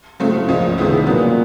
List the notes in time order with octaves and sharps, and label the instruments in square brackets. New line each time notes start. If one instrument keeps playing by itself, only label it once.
[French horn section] A2 [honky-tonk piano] C#3 F#3 A3 C4 F4
[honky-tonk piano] C#2 C#3 F3 [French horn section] A#2
[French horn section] A2 [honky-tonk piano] C3 D#3 G#3 B3 E4
[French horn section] A#2 [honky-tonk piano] C#3 F#3 B3